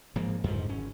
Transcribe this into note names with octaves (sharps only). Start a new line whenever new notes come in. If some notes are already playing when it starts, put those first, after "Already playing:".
G#2 F3 A#3
F2 G#2 D3 F3
G#1 C#4